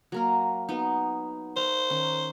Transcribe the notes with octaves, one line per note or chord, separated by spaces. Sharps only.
F#3 A#3 A#4
F#3 B3 D#4
C5 F5 A#5
D#3 C#4